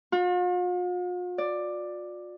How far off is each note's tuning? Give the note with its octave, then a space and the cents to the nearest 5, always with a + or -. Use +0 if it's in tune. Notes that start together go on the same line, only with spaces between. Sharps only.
F4 +45
D5 +10